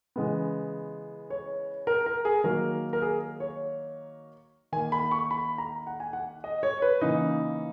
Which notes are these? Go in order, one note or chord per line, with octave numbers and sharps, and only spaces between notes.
C#3 E3 G#3 B3
C#5
A#4
A#4
G#4
D#3 F#3 A#3 A#4
A#4
G#4
C#5
D#3 A#3 G#5
B5
C#6
B5
A#5
F#5
G#5
F#5
D#5
C#5
B4
C#3 E3 A#3 D#4